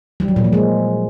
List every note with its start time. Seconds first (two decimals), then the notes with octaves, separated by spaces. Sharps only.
0.20 G3
0.28 F#3
0.36 A#2
0.44 F3
0.53 G#3